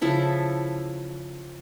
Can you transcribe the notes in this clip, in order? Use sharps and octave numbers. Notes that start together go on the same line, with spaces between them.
C#3 F3 E4 A4